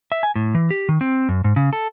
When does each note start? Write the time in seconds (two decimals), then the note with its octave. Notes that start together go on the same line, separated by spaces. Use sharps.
0.12 E5
0.23 G#5
0.36 A2
0.55 E3
0.71 G4
0.89 D#3
1.01 C4
1.29 F#2
1.44 G#2
1.56 C#3
1.73 A4